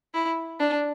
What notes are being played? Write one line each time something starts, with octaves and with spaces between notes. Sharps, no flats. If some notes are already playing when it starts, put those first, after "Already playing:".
E4
D4